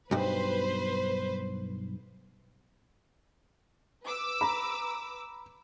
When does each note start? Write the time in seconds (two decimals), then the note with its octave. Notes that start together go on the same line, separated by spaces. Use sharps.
0.11 B1 G2 B4 C5
4.04 B4 D6 E6
4.41 A#5 B5